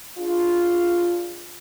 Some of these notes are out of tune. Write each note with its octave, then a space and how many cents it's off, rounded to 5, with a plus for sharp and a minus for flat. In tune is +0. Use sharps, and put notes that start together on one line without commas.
D4 +0 F4 +0 G#4 +0